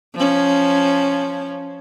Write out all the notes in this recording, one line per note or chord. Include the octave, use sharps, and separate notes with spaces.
F3 C#4